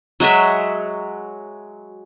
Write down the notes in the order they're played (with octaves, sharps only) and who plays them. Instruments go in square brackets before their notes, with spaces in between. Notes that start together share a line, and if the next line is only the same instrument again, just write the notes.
[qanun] F#3 G#3 F#4 E5